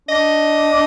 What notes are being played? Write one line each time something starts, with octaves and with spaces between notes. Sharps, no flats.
D4 D#5